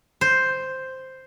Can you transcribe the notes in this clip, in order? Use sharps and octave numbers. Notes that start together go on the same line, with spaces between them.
C5